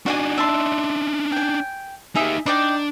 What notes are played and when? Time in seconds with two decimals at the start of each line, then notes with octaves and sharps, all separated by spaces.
0.06 D4 D#4 F#4 F#5 G#5
0.38 E5 A5 C6
1.32 G5 G#5
2.15 D#4 G4 G#4 E5
2.46 D4 D#4 D5 G5